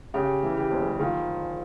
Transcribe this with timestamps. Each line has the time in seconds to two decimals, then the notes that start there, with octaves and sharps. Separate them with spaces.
0.14 C#3 G4
0.43 E3
0.57 G4
0.71 F#1
0.99 D#3 F4